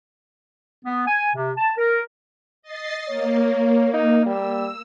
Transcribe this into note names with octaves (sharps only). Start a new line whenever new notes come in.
B3
G#5
C3
A5
A#4
D#5 A6 C7
A#3 C#5
D#4
G3 E6